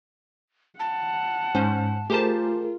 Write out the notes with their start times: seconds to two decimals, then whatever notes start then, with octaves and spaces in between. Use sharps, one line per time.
0.80 F#5 A5
1.55 G#2 C#4 C5
2.10 A3 F4 G4 G#4 A#4 C5 A5